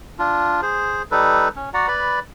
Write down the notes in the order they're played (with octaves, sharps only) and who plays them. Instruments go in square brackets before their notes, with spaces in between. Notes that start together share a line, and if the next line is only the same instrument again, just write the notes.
[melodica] D4 F4
G#4 C5
G3 D#4 A4 B4
C#4
F#4 D5 F#5 A#5
B4 D5 B5